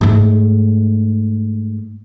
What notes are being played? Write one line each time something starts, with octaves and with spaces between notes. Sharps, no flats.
G#2 A3